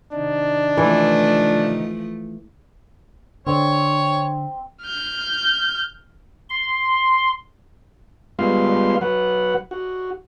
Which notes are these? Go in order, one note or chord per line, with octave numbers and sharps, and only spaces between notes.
C3 D#3 D4 D#4
E3 F3 A3
D3 C4 C#5
F6 G6
C6
G3 G#3 B3 F4 F5 C6
F#3 B4 F#5
F#4